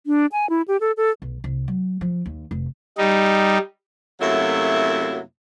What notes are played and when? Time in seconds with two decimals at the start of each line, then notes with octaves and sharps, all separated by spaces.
0.07 D4
0.32 G#5
0.50 E4
0.68 G4
0.81 A4
0.97 A4
1.22 B1
1.44 C2
1.68 F#3
2.01 F3
2.26 D#2
2.51 F1
2.98 G3 D#4
4.21 F#2 C3 F#3 A3 A#3 E4